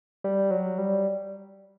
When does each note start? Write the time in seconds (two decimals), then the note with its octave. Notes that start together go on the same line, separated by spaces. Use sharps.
0.24 G3
0.51 F#3
0.78 G3